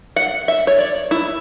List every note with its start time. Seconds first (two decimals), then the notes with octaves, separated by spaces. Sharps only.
0.16 F#5
0.48 E5
0.67 C#5
0.79 D5
1.11 E4